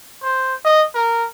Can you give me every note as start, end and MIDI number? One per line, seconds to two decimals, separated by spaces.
0.23 0.55 72
0.65 0.85 75
0.95 1.27 70